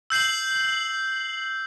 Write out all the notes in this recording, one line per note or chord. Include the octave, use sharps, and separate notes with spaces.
E6 G6 C7 F#7